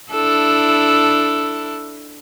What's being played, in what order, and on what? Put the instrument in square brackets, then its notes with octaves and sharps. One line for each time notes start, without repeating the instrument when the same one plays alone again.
[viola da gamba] D4 E4 A4